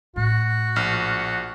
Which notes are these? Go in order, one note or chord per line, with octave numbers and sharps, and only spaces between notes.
A2 A3 F#4
A#1 F6